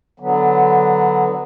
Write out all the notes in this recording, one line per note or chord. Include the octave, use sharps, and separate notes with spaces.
D3 F#3 B3